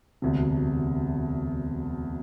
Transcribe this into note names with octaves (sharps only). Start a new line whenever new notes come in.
E1 D2 C3